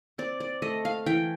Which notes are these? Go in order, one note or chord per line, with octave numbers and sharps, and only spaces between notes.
C4 D5
D5
A3 D#5
F5
E3 G5